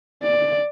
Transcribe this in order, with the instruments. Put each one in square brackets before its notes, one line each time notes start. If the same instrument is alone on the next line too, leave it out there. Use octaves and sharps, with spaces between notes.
[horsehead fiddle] D5